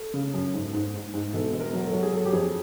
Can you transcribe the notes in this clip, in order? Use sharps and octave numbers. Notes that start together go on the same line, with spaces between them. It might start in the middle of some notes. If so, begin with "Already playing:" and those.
Already playing: A4
C#3
F#2
G#2
G#2
G#2
G#2
E1 A4
E1
A#4
F#3
A4
F#3
G#4
F#3 A4
G4
F2 G#4